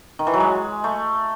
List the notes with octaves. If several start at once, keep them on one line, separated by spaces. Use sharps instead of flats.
D#3
E3
F#3
G#3
A3